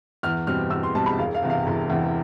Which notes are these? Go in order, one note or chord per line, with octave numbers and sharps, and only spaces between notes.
E2 F6
B2 G3 C4 F6
E2 E6
C6
B2 G3 C4 A5
B5
E1 F5
F5
E2 C3
F5
E1
E2 C3